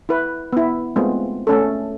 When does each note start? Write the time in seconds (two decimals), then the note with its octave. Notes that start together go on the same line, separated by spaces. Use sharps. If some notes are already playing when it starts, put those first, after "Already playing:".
0.09 E4 B4
0.53 B3 E4
0.96 G#3 A3 B3 C4 F4
1.47 A3 C#4 A4